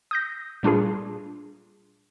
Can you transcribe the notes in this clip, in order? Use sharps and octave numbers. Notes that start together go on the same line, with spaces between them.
D#6 G6 A#6
A#2 G3 D4 F4 G#4